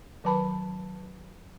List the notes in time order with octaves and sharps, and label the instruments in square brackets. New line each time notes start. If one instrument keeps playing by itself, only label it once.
[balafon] D#3 F#3 B4 A5 B5